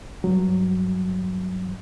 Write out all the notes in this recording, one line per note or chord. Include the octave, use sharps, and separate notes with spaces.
G2 F#3